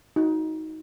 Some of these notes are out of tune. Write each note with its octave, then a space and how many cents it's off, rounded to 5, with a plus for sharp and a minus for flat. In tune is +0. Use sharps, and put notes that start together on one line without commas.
D#4 +20 F#4 +0